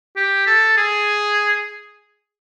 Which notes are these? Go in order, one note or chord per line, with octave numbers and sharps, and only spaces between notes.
G4
A4
G#4